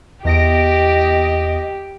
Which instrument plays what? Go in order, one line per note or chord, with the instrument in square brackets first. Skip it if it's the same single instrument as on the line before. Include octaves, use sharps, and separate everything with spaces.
[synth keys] E2 A#6 D7 [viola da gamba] G4 [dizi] D#5